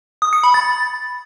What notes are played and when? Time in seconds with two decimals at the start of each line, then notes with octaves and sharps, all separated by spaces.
0.22 D#6
0.33 C#7
0.44 B5
0.54 A6